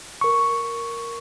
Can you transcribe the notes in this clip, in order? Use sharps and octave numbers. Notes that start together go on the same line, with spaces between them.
A#4 C#6